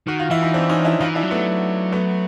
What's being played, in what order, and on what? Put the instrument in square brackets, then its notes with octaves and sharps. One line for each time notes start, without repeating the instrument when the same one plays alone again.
[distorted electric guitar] D#3 [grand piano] F#4
[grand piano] F4
[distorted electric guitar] E3 [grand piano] E4
[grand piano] D#4
C4 D4
C#4 D#4
D4 E4
[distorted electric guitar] E3 [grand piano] D#4 F4
[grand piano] D4 E4
[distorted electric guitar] F#3
[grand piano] A3 B3
A3 B3